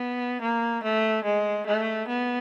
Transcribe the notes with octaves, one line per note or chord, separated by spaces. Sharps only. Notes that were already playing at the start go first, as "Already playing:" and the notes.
Already playing: B3
A#3
A3
G#3
A3
B3